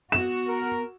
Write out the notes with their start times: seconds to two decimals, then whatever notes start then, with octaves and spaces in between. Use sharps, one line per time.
0.12 B3 F#4 E7
0.48 A#4